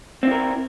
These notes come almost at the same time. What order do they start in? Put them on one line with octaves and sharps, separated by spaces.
C4 E4 A#4